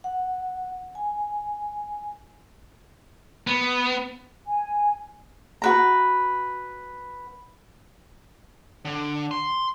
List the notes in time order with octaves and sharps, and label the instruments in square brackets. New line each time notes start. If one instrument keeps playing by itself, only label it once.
[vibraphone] F#5
G#5
[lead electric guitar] B3
[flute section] G#5
[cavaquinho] F#4 B4 A#5
[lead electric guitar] D3
C6